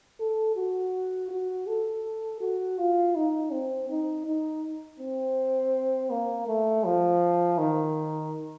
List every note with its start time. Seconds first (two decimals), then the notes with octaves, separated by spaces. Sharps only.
0.20 A4
0.56 F#4
1.31 F#4
1.67 A4
2.41 F#4
2.78 F4
3.15 D#4
3.52 C4
3.89 D#4
4.26 D#4
5.00 C4
6.10 A#3
6.47 A3
6.84 F3
7.58 D#3